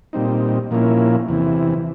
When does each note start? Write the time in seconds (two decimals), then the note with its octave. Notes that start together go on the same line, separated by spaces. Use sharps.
0.13 A#2 G3 C4 D#4
0.71 A#2 F3 A#3 C#4 E4
1.28 E2 C3 E3